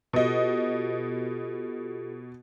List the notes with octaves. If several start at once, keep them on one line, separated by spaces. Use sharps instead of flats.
B2 F4 G4 A4 D#5